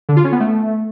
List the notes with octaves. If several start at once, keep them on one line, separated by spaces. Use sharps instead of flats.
D3
F4
C#4
B3
A3